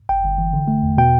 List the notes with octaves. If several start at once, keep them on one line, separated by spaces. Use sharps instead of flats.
G1 G5
G1
E3
D3
A3
E2
B2 G5